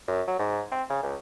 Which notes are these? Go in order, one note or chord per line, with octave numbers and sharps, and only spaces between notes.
F#2
F#3
G#2
C4
C#3
C#2